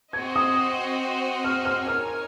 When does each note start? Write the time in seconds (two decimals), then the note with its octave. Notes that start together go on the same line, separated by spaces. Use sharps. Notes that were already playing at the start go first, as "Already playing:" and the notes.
0.13 C4 F#4 C5 D#5 G#6
0.36 D#6
1.44 F6
1.65 F6
1.87 D#4 A#4 C#5 G#5 F6